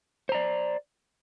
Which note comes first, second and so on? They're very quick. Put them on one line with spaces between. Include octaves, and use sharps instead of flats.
C5 A#5 D5